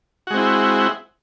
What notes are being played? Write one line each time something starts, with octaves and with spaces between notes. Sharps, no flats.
G#3 C4 E4 F#4